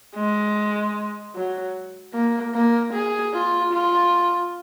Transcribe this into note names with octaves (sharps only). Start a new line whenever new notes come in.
G#3
F#3
A#3
A#3
G#4
F4
F4